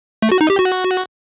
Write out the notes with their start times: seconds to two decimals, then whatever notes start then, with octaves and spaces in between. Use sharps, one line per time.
0.22 A3
0.32 F#4
0.41 D#4
0.50 G4
0.59 F#4